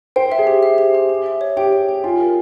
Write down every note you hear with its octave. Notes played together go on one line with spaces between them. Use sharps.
C5 G5
E5
G#4
G4
E5
G4
G4
G4
E5
C#5
G4 G5
C#5
G5
F4 G#5
A#4